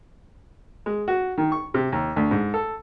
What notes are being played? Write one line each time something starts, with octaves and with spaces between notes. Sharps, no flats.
G#3
F#4
D#3
C#6
C3
D#2
D2
G#2
A4